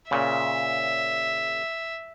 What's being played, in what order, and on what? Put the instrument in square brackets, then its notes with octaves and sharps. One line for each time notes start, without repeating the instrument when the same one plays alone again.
[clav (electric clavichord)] A#2 C#3 [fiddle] E5